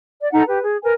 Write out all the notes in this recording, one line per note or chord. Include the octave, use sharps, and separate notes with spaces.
D5
D#4 A4 F#5 A#5
G4 B4
G#4
A#4 B4 G#5